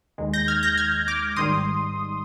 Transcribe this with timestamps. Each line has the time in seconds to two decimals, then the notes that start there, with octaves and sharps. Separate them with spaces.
0.18 D#2 D#3 G#3
0.33 G6 A#6
0.48 F6 G#6
0.63 G6 A#6
0.77 F6 G#6
1.08 D6 F6
1.36 G#1 G#2 D#3 G3 C6 D#6